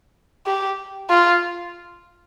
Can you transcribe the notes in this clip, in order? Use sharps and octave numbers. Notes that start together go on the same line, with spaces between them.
G4
F4